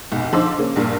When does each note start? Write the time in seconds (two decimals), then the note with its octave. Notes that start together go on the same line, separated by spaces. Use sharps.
0.12 F1 B1
0.32 D3 F3 D#4 C5 D6 E6
0.58 C#3 A#3 C#4
0.76 A#1 G2 A#2